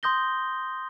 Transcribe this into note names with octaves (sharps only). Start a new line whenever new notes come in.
C6 D#6 G6 A#6 G7